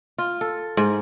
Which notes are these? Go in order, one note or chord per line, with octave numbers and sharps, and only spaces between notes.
F4
A4
G#2